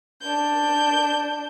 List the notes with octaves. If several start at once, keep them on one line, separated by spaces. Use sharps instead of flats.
D4 G6